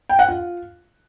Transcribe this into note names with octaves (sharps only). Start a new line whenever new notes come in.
G5
F#5
F4